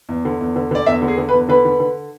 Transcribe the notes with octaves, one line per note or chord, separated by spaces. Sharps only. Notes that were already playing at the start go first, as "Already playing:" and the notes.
E2
D3
E2
D3
D3 D5
E2 E5
D3
G#4
D3
B4
E2
D3 B4
D3
D3